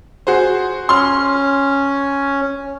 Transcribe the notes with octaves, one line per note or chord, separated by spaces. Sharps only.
F#4 G#4 C5
C#4 C6 F6